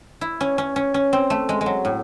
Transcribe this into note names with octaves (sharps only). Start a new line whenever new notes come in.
E4
C#4
C#4
C#4
C#4
C4
A3
G#3
G#3
F#3
A2